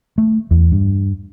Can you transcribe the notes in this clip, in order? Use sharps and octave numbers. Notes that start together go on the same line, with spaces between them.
A3
E2
G2